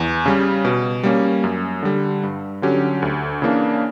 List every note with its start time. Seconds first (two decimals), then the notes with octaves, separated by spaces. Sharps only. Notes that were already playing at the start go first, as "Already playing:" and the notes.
Already playing: E2
0.26 C#3 G3
0.65 B2
1.03 G3 A#3 C#4
1.44 F#2
1.83 D3 G3
2.23 G2
2.62 D3 F#3 C#4 G4
3.02 D2
3.42 C#3 E3 A#3 D4